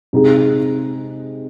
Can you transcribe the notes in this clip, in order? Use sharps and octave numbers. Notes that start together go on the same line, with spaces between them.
C3 G#3 D#4 G#4